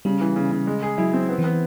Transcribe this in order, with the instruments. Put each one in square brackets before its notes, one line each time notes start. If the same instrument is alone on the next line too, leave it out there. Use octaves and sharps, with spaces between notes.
[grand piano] C#3 [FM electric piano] G3
[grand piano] E3
C#3
C#3
G#3
G#4
[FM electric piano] F#3 [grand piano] E4
[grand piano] C4
B3
[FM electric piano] E3
[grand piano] B3